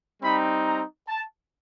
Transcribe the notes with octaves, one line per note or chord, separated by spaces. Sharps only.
G3 C4 D#4 B5
A#5
A5